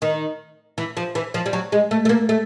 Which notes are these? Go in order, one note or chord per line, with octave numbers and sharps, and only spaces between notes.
D#3
E3
F3
E3
F3
G3
F#3
G#3
A3
A3
A#3
A3